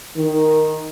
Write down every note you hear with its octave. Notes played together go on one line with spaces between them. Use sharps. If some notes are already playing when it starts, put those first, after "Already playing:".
D#3